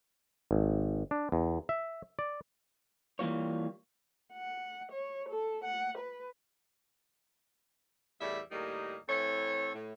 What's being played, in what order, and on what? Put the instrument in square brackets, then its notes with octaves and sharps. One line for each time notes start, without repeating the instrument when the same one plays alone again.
[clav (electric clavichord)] G#1
D4
E2
E5
D5
[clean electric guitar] E3 G3 A#3 F4 C#5
[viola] F#5
C#5
A4
F#5
B4
[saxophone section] E2 A2 G3 E4 D5 E5
D#2 A2 G3 A#3 D#4 G#4
A2 E3 C4 A4 C#5
A2